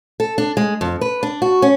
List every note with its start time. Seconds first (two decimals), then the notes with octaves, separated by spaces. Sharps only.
0.20 A4
0.38 D4
0.57 G#3
0.81 F2
1.01 B4
1.23 D4
1.42 F#4
1.62 C#4